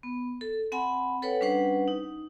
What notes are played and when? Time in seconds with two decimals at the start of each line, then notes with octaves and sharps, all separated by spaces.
0.03 B3
0.41 A4
0.72 C4 F#5 G#5 B5
1.22 A4 B4 C#5 F#5 G5
1.41 G3 C#4 D4 B4 C5 F#5
1.88 D#4